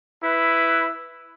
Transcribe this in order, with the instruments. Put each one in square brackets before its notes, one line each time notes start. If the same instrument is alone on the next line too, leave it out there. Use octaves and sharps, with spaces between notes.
[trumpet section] E4 B4